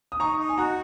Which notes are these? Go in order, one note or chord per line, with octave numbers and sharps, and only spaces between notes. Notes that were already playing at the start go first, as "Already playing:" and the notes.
D#6
D#4 A#5 C#6
D#4
G#5
F#4 F#5 A#5